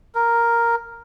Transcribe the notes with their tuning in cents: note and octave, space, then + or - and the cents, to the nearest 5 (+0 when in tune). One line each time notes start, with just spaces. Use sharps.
A#4 +0